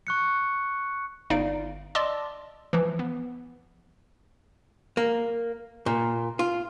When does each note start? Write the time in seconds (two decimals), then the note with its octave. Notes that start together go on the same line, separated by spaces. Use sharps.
0.07 C#6 F#6 C#7
1.30 G1 D#4 D5 F5 D7
1.95 D5 D#5 A5 C6 D6 E6
2.73 E3 F3
2.99 B3
4.97 A#3
5.86 A#2
6.39 F4